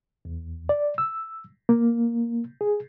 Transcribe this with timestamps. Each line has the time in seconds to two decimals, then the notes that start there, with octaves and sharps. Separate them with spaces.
0.25 E2
0.69 D5
0.98 E6
1.69 A#3
2.61 G#4